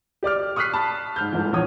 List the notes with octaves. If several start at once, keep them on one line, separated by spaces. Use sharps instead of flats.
G4 D5 D6 F6
C#6 D#6 F6 F#6 B6 C7
A5 B5
G#2 F6 G6
D#1 G#2 E3
A#1 E2 C#5 D#6